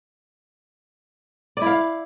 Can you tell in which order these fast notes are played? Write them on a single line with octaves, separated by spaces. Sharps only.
D5 E4 F5